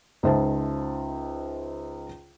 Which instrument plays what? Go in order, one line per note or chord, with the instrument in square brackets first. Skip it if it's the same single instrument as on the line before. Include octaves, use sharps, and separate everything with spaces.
[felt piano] C#2 D#4 C5 E5 A5